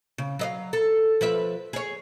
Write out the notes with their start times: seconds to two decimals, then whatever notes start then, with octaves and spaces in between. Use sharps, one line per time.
0.18 C#3
0.39 F#3 D#5 F5
0.73 A4
1.21 F3 B4 E5
1.73 G#4 C#5